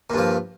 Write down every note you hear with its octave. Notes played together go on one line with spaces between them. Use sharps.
G2 A#2 F3